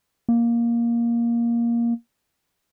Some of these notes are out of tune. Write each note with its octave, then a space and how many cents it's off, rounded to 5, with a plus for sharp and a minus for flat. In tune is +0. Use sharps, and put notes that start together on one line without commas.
A#3 +10